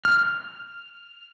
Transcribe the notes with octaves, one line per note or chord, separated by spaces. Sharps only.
F6